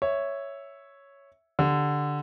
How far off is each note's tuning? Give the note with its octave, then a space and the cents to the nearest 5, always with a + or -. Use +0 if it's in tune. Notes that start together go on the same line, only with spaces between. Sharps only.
C#5 +0 E5 +0
D3 +0 G4 +0